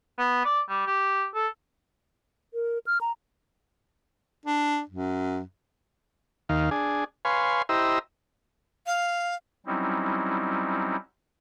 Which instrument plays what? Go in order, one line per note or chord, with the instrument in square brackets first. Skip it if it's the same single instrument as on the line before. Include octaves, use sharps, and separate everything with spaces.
[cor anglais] B3
D5
G3
G4
A4
[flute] A#4
F6
A#5
[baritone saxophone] D4
F#2
[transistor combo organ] D#2 D#3 F5
D4 G#4
B4 C#5 F5 G#5 C6
E4 G4 C5 D#5 A#5 E6
[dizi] F5
[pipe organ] F#3 G3 C4 C#4 D#4 E4